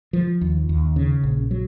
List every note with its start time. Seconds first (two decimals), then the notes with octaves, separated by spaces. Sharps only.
0.13 F3
0.41 D#2
0.69 D#2
0.96 C#3
1.23 A#1
1.51 F#3